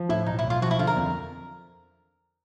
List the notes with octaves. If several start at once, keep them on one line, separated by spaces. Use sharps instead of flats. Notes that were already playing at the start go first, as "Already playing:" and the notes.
Already playing: F3
A2 E4
B1 D#4
E4
B1
F4
F3 F#4
E4
D3 F4
A#4
F2